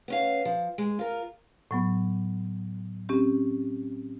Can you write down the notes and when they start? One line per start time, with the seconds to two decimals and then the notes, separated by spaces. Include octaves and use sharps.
0.08 B3 C#4 F5
0.45 F3
0.78 G#3
0.99 F4 A#4
1.71 A2 F#3 B3
3.09 C4 C#4 G4